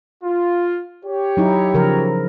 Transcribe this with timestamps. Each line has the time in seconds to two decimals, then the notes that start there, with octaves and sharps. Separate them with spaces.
0.24 F4
1.05 G4 C#5
1.37 F#3 D#4 E4
1.74 C#3 F3 A#4